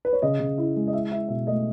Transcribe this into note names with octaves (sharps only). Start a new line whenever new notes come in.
B4
C#5
C#3 D#5
C#3
E4
G#3
D#5
E4 E5
E4 E5
B2 E5
A3 D#5